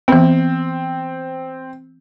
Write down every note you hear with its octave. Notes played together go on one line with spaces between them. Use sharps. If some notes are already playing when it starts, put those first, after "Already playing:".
E3 B3 C4